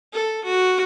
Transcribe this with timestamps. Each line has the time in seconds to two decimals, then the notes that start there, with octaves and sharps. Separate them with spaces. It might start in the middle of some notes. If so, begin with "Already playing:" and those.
0.13 A4
0.45 F#4